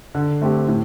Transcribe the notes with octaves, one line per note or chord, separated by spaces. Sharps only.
D3
A3 C4 G4
A2